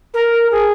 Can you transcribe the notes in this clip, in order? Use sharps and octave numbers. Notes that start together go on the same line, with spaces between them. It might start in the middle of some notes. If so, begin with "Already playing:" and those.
A#4
G#4